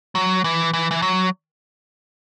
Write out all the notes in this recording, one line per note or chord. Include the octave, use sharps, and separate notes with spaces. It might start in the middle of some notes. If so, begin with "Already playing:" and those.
F#3
E3
E3
E3
F#3